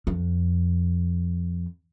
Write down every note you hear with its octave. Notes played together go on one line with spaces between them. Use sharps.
F2